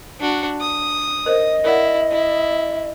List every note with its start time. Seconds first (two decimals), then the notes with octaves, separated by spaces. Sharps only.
0.20 D4 F#4
0.61 D#6
1.26 A#4 C5 D#5
1.64 E4 A#4 D5 F#5
2.12 E4